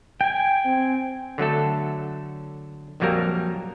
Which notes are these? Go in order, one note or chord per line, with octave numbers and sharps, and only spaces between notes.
G5 G#5
C4
D3 F#3 A3 A4
A#1 F2 F#3 G3 A#3 A#4